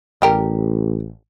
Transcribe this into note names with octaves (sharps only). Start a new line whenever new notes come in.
A1 G3 G4 A#4